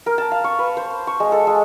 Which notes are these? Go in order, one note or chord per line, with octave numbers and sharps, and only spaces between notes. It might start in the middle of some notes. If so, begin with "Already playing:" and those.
A#4
A5
F5
C#6
B4
C5
C#6
G#3
A4
G#3